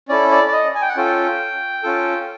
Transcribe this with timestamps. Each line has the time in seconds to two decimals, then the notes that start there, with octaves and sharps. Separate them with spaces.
0.09 C#4 E4 A4 D5
0.31 D5
0.48 D5
0.53 D#5
0.75 G#5
0.82 G5
0.89 F#5
0.96 C#4 F4 A4 G5
1.83 C#4 F4 A4